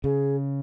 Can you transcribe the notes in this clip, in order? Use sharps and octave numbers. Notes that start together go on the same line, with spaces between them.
C#3 G#4